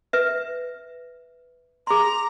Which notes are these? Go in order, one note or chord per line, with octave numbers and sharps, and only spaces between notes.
B4 E5
G#4 A#5 C6